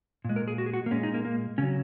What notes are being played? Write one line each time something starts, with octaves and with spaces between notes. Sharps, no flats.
A#2 G#3
A#4
G#4
F#4
G#4
F#4
A#3
A#2 G#3 C#4
D#4
A#3
A#3
C#3 F#3 C#4